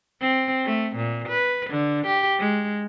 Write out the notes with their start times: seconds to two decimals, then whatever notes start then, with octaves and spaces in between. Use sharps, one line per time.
0.21 C4
0.65 A3
0.96 A#2
1.29 B4
1.70 D3
2.07 G4
2.40 G#3